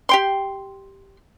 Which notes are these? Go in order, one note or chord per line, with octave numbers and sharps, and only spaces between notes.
G4 G5 C6